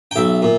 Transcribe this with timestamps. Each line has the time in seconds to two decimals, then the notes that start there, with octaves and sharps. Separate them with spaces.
0.11 G5
0.16 B1 E5
0.42 A#2